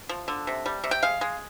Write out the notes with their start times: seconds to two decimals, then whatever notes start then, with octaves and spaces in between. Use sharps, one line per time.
0.09 F3
0.28 D3
0.47 C3
0.66 G3
0.84 C3
0.91 G5
1.03 G#3 F5
1.21 G#3